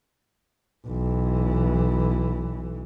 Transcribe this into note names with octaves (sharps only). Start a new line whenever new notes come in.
B1 E3